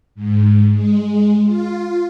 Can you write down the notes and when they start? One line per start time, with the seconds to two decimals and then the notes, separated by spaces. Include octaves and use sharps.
0.15 G#2
0.73 G#3
1.45 F4